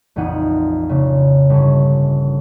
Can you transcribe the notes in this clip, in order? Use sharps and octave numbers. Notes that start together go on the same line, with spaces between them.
A#1 F2 E3 D#4 F#5 D#7
A#1 C#3
G1 C#4